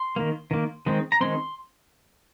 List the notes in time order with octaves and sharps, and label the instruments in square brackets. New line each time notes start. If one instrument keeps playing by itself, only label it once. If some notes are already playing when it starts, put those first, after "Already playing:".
Already playing: [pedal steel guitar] C6
D#3 A#3
D#3 A#3
D#3 G#3 C4
A#5
D#3 G#3 C4 C6